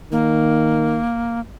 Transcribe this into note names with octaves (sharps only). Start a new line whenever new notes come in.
D#3 A#3